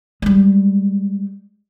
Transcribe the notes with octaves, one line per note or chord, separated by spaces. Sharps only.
G3 G#3